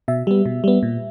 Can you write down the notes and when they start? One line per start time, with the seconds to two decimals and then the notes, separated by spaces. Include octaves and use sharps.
0.08 B2 E5
0.27 G3 B3
0.45 B2
0.64 G3 B3
0.83 A#2